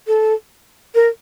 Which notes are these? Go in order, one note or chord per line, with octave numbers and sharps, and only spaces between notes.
A4
A#4